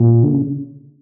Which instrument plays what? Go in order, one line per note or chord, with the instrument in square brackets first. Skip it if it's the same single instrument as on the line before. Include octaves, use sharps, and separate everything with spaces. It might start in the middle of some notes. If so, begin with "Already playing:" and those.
Already playing: [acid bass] A#2
D3
C#3